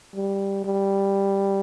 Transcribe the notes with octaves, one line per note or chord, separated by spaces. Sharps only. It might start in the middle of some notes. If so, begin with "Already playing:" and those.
G3
G3